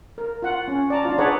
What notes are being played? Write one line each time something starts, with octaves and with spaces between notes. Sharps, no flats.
A#4
F4 F#5
C#4
D5 A5 A#5
D4 D#4 F4
D4 G#4 B4 C#5 D5 F#5